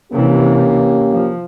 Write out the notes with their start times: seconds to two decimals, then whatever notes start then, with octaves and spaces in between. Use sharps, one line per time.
0.12 C3 E3 A#3 C#4 G4
1.12 F3